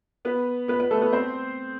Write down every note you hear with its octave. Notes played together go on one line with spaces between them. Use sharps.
B3 B4
B3 B4
B3 B4
A3 A4
B3 B4
C4 C5